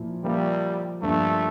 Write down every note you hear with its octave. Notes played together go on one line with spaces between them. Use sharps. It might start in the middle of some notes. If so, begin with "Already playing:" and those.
Already playing: A#2 F3 A#3 E4
F3 G3 A#3 F4 A#4 E5
G2 F3 A3 A#3 D4